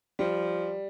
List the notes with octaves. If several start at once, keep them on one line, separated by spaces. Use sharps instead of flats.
F3 G3